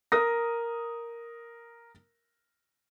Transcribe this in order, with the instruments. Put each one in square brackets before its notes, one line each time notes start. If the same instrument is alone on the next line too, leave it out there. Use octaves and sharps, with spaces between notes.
[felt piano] A#4 D#6 A#6